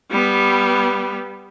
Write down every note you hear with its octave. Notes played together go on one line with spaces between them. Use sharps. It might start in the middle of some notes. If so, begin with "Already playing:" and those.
G3 B3